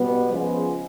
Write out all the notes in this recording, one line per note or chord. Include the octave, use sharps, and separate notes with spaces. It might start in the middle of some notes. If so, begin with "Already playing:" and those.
Already playing: B2 G3 B3
C#3 F3 G#3 B3